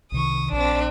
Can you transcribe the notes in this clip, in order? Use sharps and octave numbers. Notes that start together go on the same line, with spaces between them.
C2 C3 D#3 C#6 D#6
A#1 C4 D4